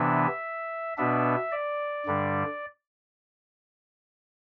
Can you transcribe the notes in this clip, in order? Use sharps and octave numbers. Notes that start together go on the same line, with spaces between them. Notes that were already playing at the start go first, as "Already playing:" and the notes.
Already playing: C3 E3 B3 D4 E5
B2 B3 D4 E5
D5
G2 D3 G3 D4